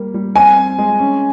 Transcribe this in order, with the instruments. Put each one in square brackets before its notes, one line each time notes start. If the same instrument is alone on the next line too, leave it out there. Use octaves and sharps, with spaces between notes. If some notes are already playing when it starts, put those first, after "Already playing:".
Already playing: [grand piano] G3 A#3
G3
[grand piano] C4 [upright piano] G#5
[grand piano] C4
G#3
C#4